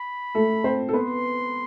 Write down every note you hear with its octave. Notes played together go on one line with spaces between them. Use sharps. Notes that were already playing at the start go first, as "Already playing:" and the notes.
Already playing: B5
A3 A4
C4 C5
A4
B3 B4 C6